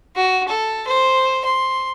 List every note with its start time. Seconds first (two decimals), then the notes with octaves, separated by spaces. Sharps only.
0.16 F#4
0.48 A4
0.87 C5
1.45 C6